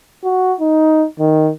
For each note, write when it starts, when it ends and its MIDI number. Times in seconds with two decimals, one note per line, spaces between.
0.24 0.54 66
0.61 1.05 63
1.19 1.50 51